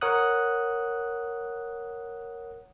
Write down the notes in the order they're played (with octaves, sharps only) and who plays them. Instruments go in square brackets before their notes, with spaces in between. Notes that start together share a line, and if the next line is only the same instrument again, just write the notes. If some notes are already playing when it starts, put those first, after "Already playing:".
[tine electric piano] A#4 C#5 F#5 D#6 F#6